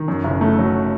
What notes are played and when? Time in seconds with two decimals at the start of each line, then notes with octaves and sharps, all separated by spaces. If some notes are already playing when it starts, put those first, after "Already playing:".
Already playing: D#3
0.08 F#2
0.24 F#1
0.41 A3
0.59 F#3